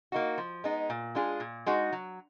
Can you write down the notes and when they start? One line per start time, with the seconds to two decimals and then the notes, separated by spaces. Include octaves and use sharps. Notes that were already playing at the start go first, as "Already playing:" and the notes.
0.12 A#3 D#4 F#4
0.38 F3
0.64 G#3 B3 D#4
0.90 A#2
1.15 G#3 D4 F4 G#4
1.40 A#2
1.66 G#3 D#4 F#4
1.92 F#3